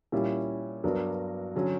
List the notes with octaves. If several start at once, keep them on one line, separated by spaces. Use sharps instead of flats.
A#2 G3 C#4 E4
G2 F#3 B3 D4 A#4
D3 F#3 C#4